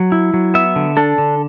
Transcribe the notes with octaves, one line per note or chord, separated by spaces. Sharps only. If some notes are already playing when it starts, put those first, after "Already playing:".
Already playing: F#3
E4
F#3
B3 E5
D3
D4 A4
D3